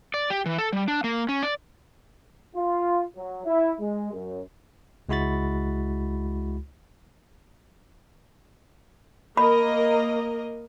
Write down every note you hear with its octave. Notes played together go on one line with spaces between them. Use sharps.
D5
G4
E3
A4
G3
D4
A#3
C#4
D5
F4
F#3
E4
G#3
F#2
C#2 G#3 E4 F#4 B5 A6
A#3 A#4 D#5 B5